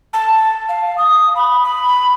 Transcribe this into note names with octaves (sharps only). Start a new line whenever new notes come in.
A5
F5
D#6
B5
B5